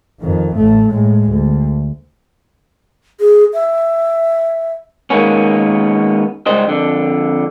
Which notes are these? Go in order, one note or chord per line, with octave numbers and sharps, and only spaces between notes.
F2 D#3
A1 A3
A2 G#3
D2
G#4
E5
D#3 G#3 A#3 B3 C#4
C#2 G#2 G3 G#3 C5 D#5
F2 D3